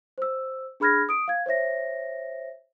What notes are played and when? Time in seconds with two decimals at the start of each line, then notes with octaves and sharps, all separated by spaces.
0.18 C5 E6
0.80 D4 G#4 B5 F6 G#6 A#6
1.09 D#6 D7
1.28 F5 G#6
1.46 C5 C#5 E5 A#6